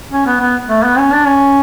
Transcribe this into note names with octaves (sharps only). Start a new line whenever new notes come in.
C#4
B3
B3
A3
B3
C#4
D4
C#4